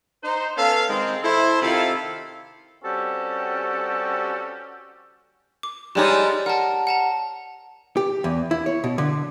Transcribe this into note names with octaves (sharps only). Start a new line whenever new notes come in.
D#4 C5
B3 C#4 A4 C#5 F5
D#3 G#3 C4
E4 A4 C5
C3 D#3 E4 F4 A4 F5
G3 C4 C#4 F#4 G4 A4
D6
G3 G#3 D#4 G4 C#5 D5
A#4 F#5 A5
F#5 A5 A#5
G4
E2
E4
C#5
B2
D3